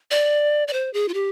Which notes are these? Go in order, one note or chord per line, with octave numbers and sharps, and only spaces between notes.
D5
D5
C5
G#4
F4
G4